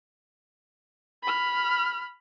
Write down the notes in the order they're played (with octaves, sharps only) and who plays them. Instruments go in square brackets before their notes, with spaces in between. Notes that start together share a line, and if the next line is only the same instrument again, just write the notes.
[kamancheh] B5 F6